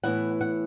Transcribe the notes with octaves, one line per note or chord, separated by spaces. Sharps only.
A2 E3 B3 E4 F#5
F#5